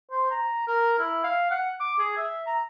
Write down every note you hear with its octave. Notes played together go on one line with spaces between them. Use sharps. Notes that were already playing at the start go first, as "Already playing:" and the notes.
C5
A#5
A#4
E4
F5
F#5
D6
G#4
E5
A#5